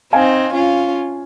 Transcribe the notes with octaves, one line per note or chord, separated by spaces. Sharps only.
C4 D#4 F5 G#5
C#4 F4